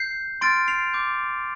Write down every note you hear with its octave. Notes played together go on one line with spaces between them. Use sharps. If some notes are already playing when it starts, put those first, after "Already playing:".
Already playing: G6 C7
C6 F6 A6 D7
C7 F7
D6 G6